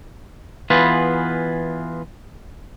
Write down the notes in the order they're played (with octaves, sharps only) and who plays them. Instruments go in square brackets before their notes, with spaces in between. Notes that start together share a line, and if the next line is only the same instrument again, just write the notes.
[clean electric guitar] E3 B3 F4 G#4 B4